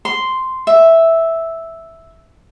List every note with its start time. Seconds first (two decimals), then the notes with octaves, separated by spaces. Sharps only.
0.05 C6
0.67 E5